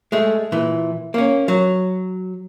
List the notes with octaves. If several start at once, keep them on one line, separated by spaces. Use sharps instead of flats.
G#3 A3
A#2 E3
A#3 C#4
F#3